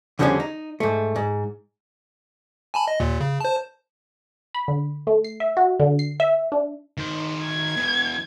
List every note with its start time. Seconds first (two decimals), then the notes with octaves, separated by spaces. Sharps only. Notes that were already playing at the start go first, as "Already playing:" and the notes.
0.19 E2 D3 F3 G3 B3 C#4
0.40 D#4
0.80 G#2 A3
1.16 G#2
2.74 G#5 A5 B5
2.88 D#5
3.00 D#2 A#2
3.20 C#3
3.40 C5 A5
4.54 B5
4.68 D3
5.07 A3
5.24 C7
5.40 E5
5.57 F#4
5.80 D3
5.99 C7
6.20 E5
6.52 D4
6.98 D#3 C5
7.43 G#6
7.76 B2 E3